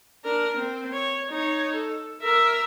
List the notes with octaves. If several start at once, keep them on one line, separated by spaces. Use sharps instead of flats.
D4 A#4
C4
C#5
D#4 C#5
A4
A#4 E5